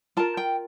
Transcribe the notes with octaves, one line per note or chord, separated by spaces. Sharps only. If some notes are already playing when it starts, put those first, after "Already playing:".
F4 A#4 A5
G5